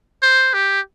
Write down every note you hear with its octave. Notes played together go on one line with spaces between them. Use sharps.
C5
G4